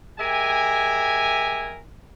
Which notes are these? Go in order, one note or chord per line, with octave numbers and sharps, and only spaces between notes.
G#3 G4 A#4 E5 G#5